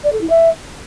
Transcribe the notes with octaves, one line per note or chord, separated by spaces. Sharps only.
D5
A4
E4
E5